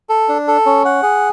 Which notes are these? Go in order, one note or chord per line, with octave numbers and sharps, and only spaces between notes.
A4
D4
A4
C#4
F#5
G#4